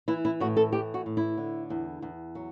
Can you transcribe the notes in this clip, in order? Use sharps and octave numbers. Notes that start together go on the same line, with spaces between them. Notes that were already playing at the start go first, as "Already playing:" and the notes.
E3 E4
E4
A2 F#4
A4
E3 G4
F#4
A2
E4
D3
E2
E2
F#3